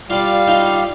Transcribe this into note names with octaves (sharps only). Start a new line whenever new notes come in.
G3 F4 D5 F5
D#4 F4